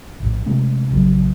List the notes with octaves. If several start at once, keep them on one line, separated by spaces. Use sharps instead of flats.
A#1 A2
C3 G#3 A3 C#4
A#1 C#3 F3 F#3